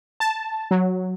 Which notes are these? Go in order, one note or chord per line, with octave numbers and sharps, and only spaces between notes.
A5
F#3